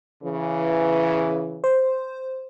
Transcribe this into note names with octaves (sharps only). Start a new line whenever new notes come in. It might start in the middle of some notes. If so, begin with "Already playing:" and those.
C#3 E3
C5